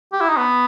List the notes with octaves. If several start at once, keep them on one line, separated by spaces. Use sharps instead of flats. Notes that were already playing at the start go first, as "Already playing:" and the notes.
G4
E4
D#4
B3